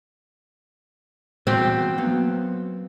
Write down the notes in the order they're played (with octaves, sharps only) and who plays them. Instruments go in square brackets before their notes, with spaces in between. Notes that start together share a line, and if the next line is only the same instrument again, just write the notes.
[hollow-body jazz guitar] E2 F#4 G5 [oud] C4
[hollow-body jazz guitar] F#3 A#3 B3